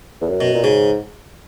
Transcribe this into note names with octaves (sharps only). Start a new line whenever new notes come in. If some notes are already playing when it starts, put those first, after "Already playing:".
E2
F#2
B2
A#2
G#2 C#3